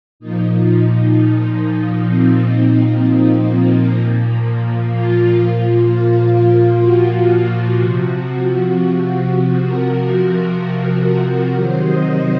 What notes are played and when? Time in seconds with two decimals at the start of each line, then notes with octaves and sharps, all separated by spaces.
0.20 A#2 F3 D#4
2.09 C4
3.03 C4
3.35 A#3
3.66 A#3
3.98 A#2 F3
4.93 F4
6.81 F#4
7.76 C3 F3
8.70 F#4
9.65 A#4
11.54 C3 D#3 F#3 C5
11.86 D#5